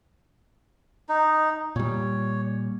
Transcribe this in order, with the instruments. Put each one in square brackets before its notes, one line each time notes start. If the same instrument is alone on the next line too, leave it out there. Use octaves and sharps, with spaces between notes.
[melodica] D#4
[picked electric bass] A#2 G3 [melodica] C#5